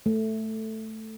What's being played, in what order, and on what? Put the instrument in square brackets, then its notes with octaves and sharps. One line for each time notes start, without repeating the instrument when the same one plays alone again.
[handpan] A3